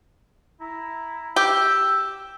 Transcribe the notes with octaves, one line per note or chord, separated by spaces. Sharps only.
E4 A#5
G4 E6